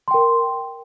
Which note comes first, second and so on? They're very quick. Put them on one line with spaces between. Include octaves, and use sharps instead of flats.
C6 G5 A#4